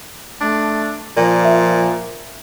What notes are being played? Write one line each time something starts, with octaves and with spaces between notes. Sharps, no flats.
A3 D4
A#2 F3 D5
E5